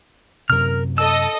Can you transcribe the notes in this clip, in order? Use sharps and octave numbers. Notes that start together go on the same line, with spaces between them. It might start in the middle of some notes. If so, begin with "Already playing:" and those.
F#2 C3 A#4 F6
A4 D#5 E6